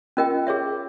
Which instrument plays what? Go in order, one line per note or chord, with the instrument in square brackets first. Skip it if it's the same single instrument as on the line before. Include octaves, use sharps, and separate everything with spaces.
[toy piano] C#4 F4 A#4 D#5 G5
G#4 C#5 E5